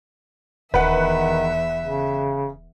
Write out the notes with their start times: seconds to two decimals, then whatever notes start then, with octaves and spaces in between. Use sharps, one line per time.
0.74 D#1 E2 D#3 B4 E5 F#5
1.84 C#3